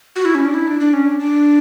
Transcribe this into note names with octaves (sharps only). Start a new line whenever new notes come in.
F#4
E4
C#4
D4
E4
D4
D4
C#4
D4
D4